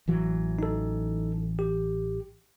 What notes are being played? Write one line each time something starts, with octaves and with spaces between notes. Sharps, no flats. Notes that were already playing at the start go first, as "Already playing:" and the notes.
A1 E3 F#3
D#4 A4
G4